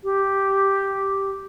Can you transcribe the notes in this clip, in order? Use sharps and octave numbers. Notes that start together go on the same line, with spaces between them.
G4